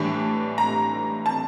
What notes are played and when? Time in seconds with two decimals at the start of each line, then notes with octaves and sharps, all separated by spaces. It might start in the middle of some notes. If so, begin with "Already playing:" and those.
Already playing: A2 E3 G3 D4 A5
0.58 A#5
1.26 A5